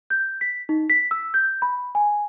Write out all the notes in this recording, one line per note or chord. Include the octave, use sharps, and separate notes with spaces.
G6
B6
D#4
B6
E6
G6
B5
G#5